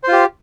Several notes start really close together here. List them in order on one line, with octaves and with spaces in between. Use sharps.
C5 F4 G4